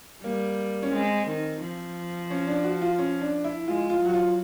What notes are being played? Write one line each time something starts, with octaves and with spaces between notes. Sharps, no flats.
G3 A#3
C#4
G#3 C4
D#3
F3
C#4
D4
F#4
F4
C#4
D4
E4
G#3 F4
F4
F#3 F#4
F4